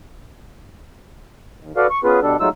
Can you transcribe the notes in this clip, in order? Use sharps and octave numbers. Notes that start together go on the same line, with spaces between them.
D#2
F#4 A4 B4 D5 F5
C#6
B3 C#4 F4 G#4 B4
B2 G3 D4 A4
F#3 G#3 A3 D#4 F4 E6